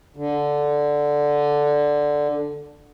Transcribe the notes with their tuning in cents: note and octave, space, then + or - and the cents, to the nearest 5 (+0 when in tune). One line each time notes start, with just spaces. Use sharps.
D3 +0